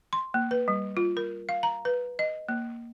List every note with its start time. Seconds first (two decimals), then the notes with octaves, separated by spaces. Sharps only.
0.13 C6
0.34 A#3
0.51 B4
0.68 G3
0.97 F4
1.17 A#4
1.49 F5
1.63 A#5
1.85 B4
2.19 D#5
2.49 A#3